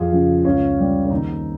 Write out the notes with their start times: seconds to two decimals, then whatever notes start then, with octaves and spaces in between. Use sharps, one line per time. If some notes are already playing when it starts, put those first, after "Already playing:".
Already playing: F2 F4 G#4
0.12 C#3 F3
0.44 C#2 C#4 F4
0.78 C3 G3
1.05 C#4
1.11 D#2 C4 D#4